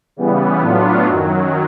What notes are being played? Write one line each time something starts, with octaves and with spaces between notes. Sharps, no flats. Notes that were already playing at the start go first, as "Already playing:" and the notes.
C#3 E3 G3 B3
A2 F#3 B3 D4 F4
F#2 D#3 F#3